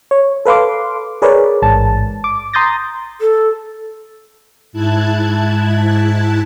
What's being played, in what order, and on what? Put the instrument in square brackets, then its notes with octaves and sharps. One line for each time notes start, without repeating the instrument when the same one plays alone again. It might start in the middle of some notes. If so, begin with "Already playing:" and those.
[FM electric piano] C#5
A4 B4 F5 C6 D6
G#4 A#4 B4 C#5 D5
A1 G#2 A5
D6
A#5 C6 D#6 G6 A6 A#6
[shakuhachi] A4
[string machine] G#2 E4 A5 F#6 G#6